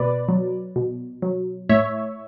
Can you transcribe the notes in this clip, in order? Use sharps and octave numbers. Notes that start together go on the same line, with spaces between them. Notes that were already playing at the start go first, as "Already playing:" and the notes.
Already playing: B2 B4 D5
F#3
B2
F#3
A2 C#5 E5